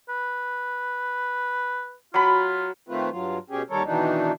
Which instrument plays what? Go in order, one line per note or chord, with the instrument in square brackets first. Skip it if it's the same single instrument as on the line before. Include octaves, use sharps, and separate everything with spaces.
[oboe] B4
[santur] F#3 B5 [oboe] F4
[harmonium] D#3 A3 C4 F4 B4
G2 F#3 F4
B2 C#4 G4 G#4
D#2 D#3 G3 A4 A#4 C#5
B2 D#3 E3 D4 D#4